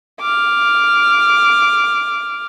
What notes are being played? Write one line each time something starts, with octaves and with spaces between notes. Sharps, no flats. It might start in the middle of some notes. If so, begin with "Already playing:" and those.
D6 F6